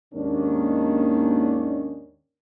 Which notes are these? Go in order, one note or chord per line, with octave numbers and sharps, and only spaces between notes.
D#2 G#2 D#3 A#3 C#4 D4